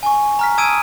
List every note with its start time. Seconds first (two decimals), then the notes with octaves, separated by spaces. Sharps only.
0.03 G#5 C#6
0.39 A#5 F6 B6
0.58 A5 D#6 E6 G#6 D7 D#7